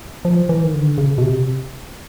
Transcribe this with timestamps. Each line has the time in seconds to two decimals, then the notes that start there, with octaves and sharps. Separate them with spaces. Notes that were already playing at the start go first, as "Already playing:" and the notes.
0.25 F3
0.49 E3
0.64 D#3
0.74 D3
0.98 C#3
1.18 B2
1.22 C3